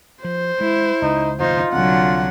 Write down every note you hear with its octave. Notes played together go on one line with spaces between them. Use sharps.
F3 C5
G#3 E4
C#2 D#4
F#1 D#2 B2 D#4 F4 C5
C2 D3 F#3 C4 F#5